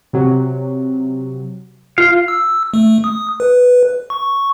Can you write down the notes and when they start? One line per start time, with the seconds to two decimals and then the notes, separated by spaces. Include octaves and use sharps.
0.13 C3 F#3
1.98 F4 F5
2.28 E6
2.74 A3
3.04 D#6
3.40 B4
4.10 C#6